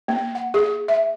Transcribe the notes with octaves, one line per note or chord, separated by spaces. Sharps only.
A#3
F#5
G#4
E5